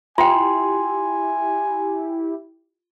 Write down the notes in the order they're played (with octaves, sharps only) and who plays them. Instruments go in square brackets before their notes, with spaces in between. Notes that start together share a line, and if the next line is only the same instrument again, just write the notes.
[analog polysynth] E4 G4 [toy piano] F4 G5 [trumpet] G#5 [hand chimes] C6